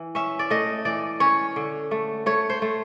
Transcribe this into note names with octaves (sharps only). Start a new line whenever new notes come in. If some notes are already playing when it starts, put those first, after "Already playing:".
Already playing: E3
C#4 E5
D5
A3 D#5
E3 D5
C#4 C#5
D3
A3
A3 C#5
C5
A3